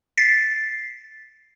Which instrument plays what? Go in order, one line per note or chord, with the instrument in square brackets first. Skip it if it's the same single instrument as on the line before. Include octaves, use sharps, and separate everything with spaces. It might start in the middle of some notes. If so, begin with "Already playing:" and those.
[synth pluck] A6 B6 C7